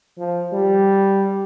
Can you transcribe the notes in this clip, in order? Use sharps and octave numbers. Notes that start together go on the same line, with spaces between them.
F3
G3